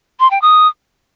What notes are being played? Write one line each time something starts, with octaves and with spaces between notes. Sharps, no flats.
C6
G5
D#6